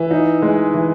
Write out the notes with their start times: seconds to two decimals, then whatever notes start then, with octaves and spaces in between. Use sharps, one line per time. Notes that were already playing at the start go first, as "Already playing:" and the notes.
Already playing: E3
0.11 D#4
0.42 G#3
0.74 E3